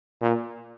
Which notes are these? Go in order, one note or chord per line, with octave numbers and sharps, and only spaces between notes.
A#2